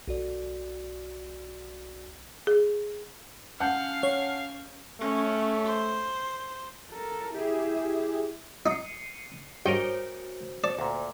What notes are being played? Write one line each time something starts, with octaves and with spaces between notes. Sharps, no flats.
B1 F#4 D5
G#4
C#4 F5 F#5 A5 G6
C#5
A3 C#4
C5
A4 A#4
E4 G4 G#4 E5
D#4 D#5 C7 C#7 D#7
G2 F#4 A#4 C5 C#5 D#5 G5
C5 D5 A5
D2 A#2